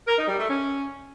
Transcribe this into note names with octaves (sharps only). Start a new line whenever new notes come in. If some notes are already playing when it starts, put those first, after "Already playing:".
A#4
D#4
G3
A3
C#4